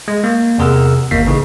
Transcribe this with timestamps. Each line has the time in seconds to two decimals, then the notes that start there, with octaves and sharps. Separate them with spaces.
0.08 G#3
0.24 A#3
0.58 E2 C3 G#4 A#4 F#5 E6
1.11 G1 D#2 A#3 B6 C7
1.26 A1 C#3 D#4 G#4